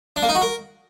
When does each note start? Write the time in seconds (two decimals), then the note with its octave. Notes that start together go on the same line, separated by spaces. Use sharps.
0.16 D4
0.23 A#3
0.29 D#4
0.35 F#4
0.41 A#4